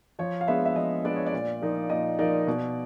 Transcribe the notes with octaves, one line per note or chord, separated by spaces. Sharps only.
F3 C#5
F5
G#3 B3 D4 E5
E5
F3 D#5
G#3 B3 D4 D5
C#5
D5
A#2
F3 A#3 D#4
A#2 D#5
F3 A#3 D#4 D5
B2